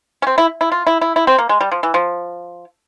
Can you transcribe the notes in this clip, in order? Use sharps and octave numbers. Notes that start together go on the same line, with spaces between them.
C#4
C4
E4
E4
F4
E4
E4
E4
C4
A#3
G#3
G3
F3
E3
F3